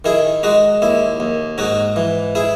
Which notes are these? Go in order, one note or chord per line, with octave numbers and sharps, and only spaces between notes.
D#3 E4 G#4
G#3 D#4 F#4
D#2 E4
D#2
G#2 D#4 F#4
E3
E4 G#4